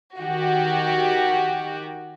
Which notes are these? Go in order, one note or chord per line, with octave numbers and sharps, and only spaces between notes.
D#3 F#4 G4